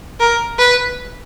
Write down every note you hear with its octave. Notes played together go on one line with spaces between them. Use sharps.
A#4
B4